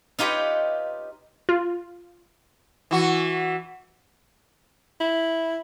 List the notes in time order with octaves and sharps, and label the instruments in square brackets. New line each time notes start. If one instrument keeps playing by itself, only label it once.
[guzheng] D#4 F4 G4 B4 C#5 D#5
[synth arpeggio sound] F4
[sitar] E3 F#4
[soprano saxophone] E4